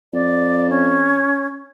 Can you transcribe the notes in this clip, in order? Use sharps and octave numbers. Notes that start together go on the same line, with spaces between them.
F2 D5
C#4